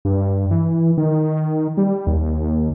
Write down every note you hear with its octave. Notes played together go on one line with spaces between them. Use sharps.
G2
E3
D#3
G3
D#2